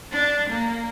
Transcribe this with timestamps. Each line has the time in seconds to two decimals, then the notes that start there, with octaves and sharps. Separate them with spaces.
0.11 D4
0.49 A#3